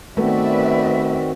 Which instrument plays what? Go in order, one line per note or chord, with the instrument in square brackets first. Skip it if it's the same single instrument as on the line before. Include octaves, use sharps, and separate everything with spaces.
[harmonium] D#3 C4 F#4 [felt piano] A3 B3 [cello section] B4 D5 E5